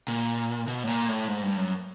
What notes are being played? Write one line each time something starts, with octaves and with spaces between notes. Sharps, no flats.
A#2
B2
A2
A#2
A2
G#2
G2
F#2